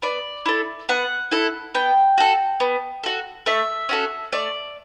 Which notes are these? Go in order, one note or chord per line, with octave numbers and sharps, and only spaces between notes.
B3 D5
E4 A4
B3 F#5
E4 A4
B3 G5
F#4 A4
B3
F#4 A4
A3 E5
C#4 F#4 A4
A3 D5